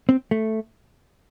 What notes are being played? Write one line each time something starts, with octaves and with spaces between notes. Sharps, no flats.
C4
A3